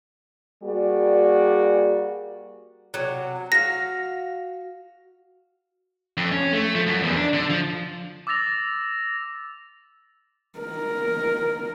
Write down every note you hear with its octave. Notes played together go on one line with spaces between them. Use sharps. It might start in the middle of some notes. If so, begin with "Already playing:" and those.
G3 A#3 F#4 G#4 D5
C3 F#3
F#4 F5 A#6
F2
C#4
A3
F3
F#2
E2
D4
D3
F3
D6 E6 A6 A#6 F7
A#4